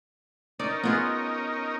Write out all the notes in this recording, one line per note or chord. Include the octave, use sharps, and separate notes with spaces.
C#4 D#4 A#4 D5
B3 F4 G#4